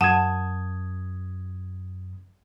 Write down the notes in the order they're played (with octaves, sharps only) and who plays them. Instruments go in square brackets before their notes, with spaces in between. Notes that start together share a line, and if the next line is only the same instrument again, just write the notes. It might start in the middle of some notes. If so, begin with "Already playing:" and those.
[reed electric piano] F#2 D#6 G#6 [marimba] F#5 [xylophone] A5